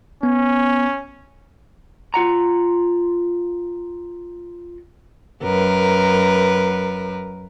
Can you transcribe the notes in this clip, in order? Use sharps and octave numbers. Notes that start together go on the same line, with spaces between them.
B3 C#4
F4 F#5 A#5
F#2 A#4 B4